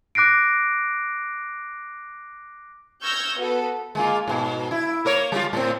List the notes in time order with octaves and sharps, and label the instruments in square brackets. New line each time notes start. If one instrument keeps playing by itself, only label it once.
[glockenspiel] D6 F#6 A#6 C7 D7
[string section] C#6 E6 F6 G6 G#6 A#6
B3 F#4 A4 B4
[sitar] G#3 A#3 F4
G#2 B2
E4
A#3 A#4 C#5
G3 F4
A2 C4